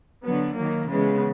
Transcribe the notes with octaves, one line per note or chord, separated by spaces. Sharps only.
D3 F#3 B3
D#3 F#3 A#3
C#3 E3 G#3 B3